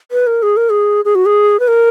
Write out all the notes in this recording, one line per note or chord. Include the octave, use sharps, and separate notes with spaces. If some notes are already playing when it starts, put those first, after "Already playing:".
B4
A#4
G#4
A#4
G#4
G#4
F#4
G#4
B4
A#4